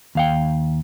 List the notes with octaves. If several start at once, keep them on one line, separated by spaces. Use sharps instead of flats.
D#2 F5 G5